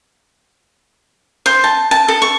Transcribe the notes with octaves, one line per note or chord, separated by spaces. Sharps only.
C5
A5
A5
A4
C#6